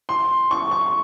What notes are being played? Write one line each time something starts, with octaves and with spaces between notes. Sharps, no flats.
C6
C#6
C#6